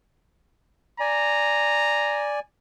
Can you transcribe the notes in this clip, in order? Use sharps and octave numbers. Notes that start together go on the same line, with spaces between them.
D5 G#5 A#5